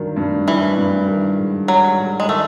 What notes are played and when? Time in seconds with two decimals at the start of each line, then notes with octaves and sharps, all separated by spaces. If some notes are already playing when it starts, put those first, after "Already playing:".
Already playing: G2 D#3 F#3
0.16 G2
0.47 E3 F#3
0.77 G2
1.08 D#3
1.38 G#2
1.68 F#3 G3
1.99 G#2
2.20 G#3
2.28 D#3 A3